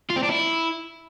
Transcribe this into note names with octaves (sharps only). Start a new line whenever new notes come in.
F4
C4
D4
E4